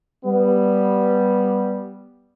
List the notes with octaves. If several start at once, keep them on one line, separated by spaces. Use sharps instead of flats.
G3 B3